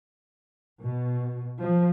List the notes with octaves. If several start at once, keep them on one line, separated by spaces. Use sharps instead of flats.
B2
F3